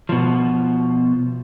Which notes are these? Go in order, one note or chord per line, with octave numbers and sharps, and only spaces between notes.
B2 F3